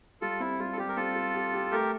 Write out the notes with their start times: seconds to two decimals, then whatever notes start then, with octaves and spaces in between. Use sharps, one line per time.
0.21 G3 F4 A4
0.40 C4 E4
0.59 G3 F4
0.72 A4
0.78 G3 G4
0.89 A#4
0.96 C4 F4 A4
1.16 G3
1.34 G4
1.53 G4
1.71 A3 G4 A#4